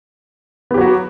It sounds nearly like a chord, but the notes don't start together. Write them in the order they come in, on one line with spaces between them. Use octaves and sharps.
B3 G4 F#3 F#4